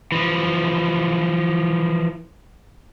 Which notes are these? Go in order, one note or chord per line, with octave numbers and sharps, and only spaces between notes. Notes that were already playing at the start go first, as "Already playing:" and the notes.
E3 F3